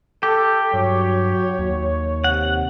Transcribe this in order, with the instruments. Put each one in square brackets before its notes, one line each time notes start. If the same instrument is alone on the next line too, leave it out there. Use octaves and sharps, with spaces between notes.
[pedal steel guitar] G4 [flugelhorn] A4
[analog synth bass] G2 [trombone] F#3 [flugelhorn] C#5
[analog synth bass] D#2
[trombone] C3 [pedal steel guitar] F#5